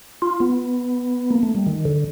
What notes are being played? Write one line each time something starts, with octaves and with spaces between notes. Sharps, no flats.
F4
B3
A#3
A3
G3
D#3
D3